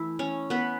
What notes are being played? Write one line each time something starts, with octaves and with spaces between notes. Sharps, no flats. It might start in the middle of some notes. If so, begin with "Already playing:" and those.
Already playing: E3 A3 E4
C#4
B3 B4